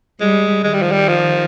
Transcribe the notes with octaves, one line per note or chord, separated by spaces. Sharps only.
G3 G#3
D#3 G#3
G3
F3
G3
F3